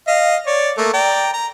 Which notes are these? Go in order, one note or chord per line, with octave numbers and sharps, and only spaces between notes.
D#5 F5
C#5 D5
A3 A#3
D5 G5 A#5
A#5